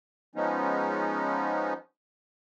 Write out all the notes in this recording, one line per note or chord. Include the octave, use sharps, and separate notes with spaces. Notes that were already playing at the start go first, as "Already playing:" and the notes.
F3 G#3 B3 C#4 D#4